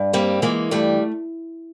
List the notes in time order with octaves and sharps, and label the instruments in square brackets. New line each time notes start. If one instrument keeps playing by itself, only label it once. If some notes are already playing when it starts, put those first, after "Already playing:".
Already playing: [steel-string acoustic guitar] G2
G3 A#3 C4
E3 G#3 A#3
G2 G3 A3